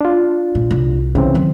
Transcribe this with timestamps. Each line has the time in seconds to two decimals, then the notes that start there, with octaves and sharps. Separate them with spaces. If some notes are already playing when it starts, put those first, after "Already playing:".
0.01 D4 F4
0.55 A#2
0.71 C2
1.15 C#3 E3 C4 D4
1.34 D#3 F#3